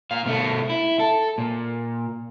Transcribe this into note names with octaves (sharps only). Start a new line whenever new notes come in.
A#2 F5
B2 A3
E4
A4
A#2